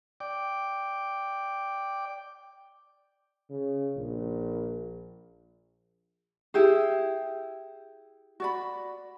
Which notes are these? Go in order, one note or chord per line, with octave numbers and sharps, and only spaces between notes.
D5 G5 D6
C#3
A#1
E4 G4 G#4
F#4 D5 B5